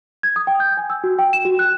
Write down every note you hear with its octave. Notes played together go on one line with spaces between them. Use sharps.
G#6
D#6
G5
G6
G#5
E6
F#4
G5
E7
F#4
F#6